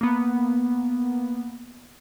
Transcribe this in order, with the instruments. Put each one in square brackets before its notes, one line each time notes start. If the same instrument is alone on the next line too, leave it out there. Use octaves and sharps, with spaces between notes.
[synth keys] A#3 B3